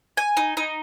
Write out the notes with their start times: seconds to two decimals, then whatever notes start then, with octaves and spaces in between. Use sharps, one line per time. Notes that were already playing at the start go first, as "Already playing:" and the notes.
0.17 G#5
0.37 D#4
0.57 D#4